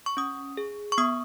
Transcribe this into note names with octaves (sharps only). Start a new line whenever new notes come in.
C#6
C#4 D#6
G#4
C#6
B3 D#6